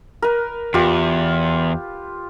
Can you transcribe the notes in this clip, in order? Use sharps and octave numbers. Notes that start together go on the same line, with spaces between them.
A#4 B4
E2 F4 G4 B4